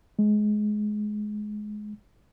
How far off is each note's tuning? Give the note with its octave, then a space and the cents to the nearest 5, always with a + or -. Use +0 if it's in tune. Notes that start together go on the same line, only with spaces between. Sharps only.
G#3 +20